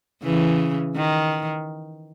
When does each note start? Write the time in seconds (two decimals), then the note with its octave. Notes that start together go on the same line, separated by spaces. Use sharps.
0.24 C#3 E3
0.96 D#3